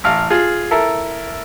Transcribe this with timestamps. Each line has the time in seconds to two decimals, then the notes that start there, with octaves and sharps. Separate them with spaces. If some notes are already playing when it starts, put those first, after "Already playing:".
0.04 A1 F5
0.30 F4 G#4
0.71 E4 A4 A#4